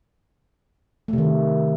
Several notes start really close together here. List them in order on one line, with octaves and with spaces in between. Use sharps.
A3 C3 D#3